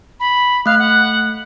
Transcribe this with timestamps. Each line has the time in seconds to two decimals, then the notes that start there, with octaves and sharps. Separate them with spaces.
0.20 B5
0.66 A3 F5 F#6
0.79 F#5